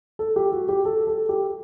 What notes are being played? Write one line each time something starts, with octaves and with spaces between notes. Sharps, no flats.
A4
G4
F#4
G4
A4
A4
G4